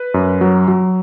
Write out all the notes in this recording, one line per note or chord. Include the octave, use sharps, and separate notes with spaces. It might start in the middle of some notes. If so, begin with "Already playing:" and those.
Already playing: B4
F#2
F#3
F#3